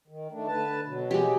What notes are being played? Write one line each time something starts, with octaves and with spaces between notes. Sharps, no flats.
D#3
D#3 A3 D4
D3 B4 A5
B2 F#3
G#3 G4